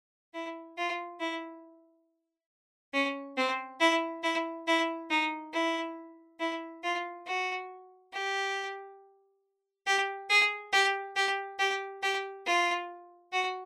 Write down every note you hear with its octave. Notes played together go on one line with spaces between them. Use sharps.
E4
F4
E4
C#4
C4
E4
E4
E4
D#4
E4
E4
F4
F#4
G4
G4
G#4
G4
G4
G4
G4
F4
F#4